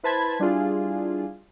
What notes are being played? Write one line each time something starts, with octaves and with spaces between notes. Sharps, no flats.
E4 B4 C5 A5 B5 G#6
G3 D4 E4 F4 G#4